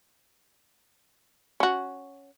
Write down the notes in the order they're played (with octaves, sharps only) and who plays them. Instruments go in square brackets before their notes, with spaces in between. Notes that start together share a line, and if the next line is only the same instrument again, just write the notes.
[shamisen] C#4 F#4